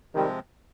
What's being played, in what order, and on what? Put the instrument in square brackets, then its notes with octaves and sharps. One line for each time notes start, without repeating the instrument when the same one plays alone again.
[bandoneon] C3 F3 G#3 C4 [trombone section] D#3 G3